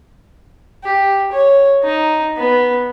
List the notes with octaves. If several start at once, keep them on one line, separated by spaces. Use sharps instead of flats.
G4
C#5
D#4
B3